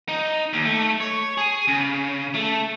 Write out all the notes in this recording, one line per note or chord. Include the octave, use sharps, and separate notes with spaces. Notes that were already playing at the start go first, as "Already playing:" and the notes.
D#4
D#2
A3
C#5
G#4
C#3
A3